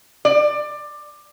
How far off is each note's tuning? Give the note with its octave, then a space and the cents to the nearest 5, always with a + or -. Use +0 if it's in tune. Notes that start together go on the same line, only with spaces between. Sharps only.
D5 +20